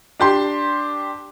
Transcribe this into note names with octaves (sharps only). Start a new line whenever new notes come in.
D4 G4 C6